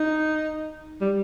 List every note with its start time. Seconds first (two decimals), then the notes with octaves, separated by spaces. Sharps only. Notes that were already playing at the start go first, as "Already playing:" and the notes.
Already playing: D#4
1.01 G3